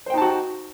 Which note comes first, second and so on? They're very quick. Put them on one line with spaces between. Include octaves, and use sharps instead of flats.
C5 G5 D#4 A5 F#4